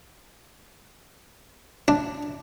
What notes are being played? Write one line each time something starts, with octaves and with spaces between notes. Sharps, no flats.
D4